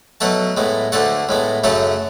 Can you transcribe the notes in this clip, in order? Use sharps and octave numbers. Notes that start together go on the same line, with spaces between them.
B2 F#3 A3 F#5 A5
A2 G#3 B3
D2 D3 A3 F#5 A5
A2 G#3 B3
F#2 C#3 F#3 A3 F#5 A5